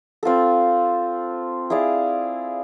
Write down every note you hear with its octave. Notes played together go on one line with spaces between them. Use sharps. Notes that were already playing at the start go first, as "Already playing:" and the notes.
C4 F4 A4
E4 G#4 D5 F5